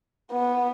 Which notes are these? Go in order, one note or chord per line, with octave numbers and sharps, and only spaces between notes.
B3